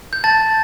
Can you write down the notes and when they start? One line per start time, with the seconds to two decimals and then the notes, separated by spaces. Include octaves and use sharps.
0.13 G6
0.24 A5 A6